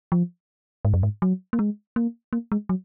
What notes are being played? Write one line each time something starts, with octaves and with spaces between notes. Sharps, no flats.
F3
G#2
F#2
G#2
F#3
A#3
G#3
A#3
A#3
G#3
F#3